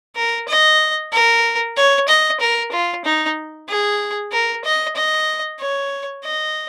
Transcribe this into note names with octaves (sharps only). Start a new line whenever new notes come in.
A#4
D#5
A#4
C#5
D#5
A#4
F4
D#4
G#4
A#4
D#5
D#5
C#5
D#5